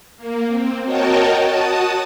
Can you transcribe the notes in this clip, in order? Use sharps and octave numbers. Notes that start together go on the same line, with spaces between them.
A#3
C4
F#4 A#4 C#5 D#5 G5 A5
F#4 A5 D#6